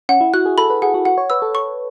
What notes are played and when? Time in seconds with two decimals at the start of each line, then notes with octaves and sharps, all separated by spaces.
0.09 C#4 F#5
0.21 E4
0.34 F#4 F#6
0.46 G#4
0.58 A4 B5
0.70 B4
0.82 G#4 F#5
0.94 F#4
1.05 F#4 F#5
1.18 C#5
1.30 B4 E6
1.42 A4
1.55 C#6